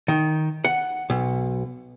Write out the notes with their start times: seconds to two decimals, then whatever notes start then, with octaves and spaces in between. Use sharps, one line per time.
0.08 D#3
0.65 F#5
1.10 B1